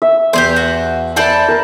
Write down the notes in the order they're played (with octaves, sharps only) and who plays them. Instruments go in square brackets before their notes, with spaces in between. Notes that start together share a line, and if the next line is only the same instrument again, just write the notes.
[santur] E5
[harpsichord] E2 [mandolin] G4 G#4 C5
[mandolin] F#4
[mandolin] A4 C5 D5 [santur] B4 E5 A5
[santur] A#4 B4